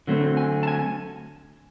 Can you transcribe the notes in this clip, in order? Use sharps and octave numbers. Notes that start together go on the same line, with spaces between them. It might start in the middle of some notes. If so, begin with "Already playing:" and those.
D3 F#3 A3 C4
G#5
A5
G#5